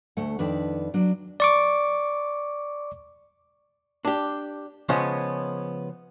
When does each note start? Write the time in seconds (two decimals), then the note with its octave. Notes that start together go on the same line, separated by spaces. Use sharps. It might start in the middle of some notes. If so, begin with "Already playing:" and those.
0.17 D2 A3 F#5
0.39 F2 D#3 D4 B4
0.94 F#3 D4
1.40 D5 C#6 D6
4.05 D4 G4
4.89 C#3 F3 G#3 B3 C#4